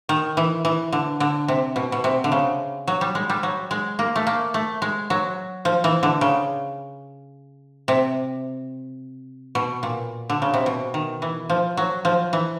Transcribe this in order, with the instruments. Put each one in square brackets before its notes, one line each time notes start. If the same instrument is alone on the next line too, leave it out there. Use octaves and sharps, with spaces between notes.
[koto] D#3
E3
E3
D3
D3
C3
B2
B2
C3
D3
C#3
F#3
G3
G#3
G3
F#3
G#3
A#3
A3
A#3
A3
G#3
F#3
F3
E3
D3
C#3
C3
B2
A#2
D3
C#3
C3
B2
D#3
E3
F3
F#3
F3
E3